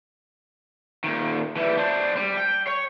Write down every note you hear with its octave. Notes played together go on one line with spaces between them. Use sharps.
A#2 D#3
E3 G3
D4 C5
G3
G5
C#5